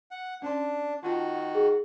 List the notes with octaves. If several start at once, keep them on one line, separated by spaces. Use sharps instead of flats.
F#5
C#4 D4 C6
D#3 F4 F#4 G5 A5
F#5
G#4